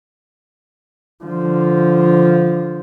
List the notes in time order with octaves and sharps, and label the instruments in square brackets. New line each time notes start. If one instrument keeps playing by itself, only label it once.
[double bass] D3 F3